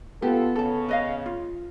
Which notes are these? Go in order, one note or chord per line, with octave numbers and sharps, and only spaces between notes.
B3 F4 G4 A4
C#3 A4 A5
B4 D#5 F5
F4